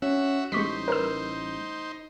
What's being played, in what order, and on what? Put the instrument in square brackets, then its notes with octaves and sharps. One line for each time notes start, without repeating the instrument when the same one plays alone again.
[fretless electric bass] C#4 [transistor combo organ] F#4 E5
[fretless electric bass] A1 G3 [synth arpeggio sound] G#3 C#6 B6 [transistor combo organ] D#4 C5
[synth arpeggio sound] A#4 B4 E6